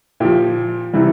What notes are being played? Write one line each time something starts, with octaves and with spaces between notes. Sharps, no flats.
A#2 F3 G4
C3 E3 G3